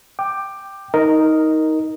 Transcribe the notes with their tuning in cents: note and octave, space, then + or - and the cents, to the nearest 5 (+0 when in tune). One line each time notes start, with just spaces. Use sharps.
G5 +0 D6 +15
D#4 +20 A#4 +0 D#5 +0